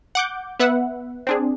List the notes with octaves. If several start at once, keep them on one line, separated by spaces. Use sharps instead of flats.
F#5 D6 G6
B3 B4 E5 F#5
C4 D4 G#4